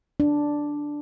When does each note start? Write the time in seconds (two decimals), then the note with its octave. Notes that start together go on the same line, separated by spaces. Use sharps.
0.20 D4